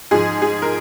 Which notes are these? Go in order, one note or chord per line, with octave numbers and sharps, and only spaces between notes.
G#2 F3 G#4
G#4
A#4